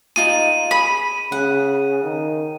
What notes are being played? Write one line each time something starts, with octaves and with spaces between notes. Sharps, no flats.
D#4 F4 G#4 D#7
G#4 B5
C#3 F#5
D#3